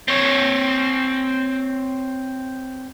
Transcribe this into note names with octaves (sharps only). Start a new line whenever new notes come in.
C4 C#5